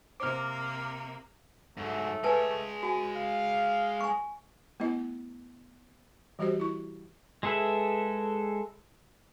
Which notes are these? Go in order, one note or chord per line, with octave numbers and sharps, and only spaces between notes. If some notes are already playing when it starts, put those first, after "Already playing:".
C3 A#3 C5 D6 F6
G#2 F#3 A3
G#3 B4 C#5 G#5 A5
F#4 G#5
F5
G#5 C#6
A3 B3 E4 D#5
E3 G3 F#4 G4 C5 D#5
E4 C#6
G#3 G#4 A4 B4 E5